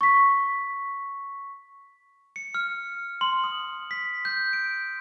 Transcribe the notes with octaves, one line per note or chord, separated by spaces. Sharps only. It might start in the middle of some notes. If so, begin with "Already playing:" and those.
C#6 B6
C#7
F6
C6
D#6
B6
G6
D7